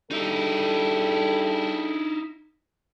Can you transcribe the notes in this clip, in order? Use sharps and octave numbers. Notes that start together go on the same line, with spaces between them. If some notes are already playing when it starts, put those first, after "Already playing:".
G3 D#4 E4 G#4 A4